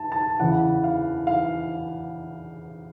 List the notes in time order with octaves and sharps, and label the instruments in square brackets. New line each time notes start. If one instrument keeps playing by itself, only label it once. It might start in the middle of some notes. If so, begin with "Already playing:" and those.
Already playing: [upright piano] A5
A5
E2 C#3 E3 F#5
F5
F5